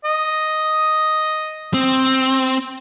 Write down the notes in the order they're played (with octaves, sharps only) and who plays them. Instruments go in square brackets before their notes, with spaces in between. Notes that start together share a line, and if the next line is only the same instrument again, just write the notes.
[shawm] D#5
[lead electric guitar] C4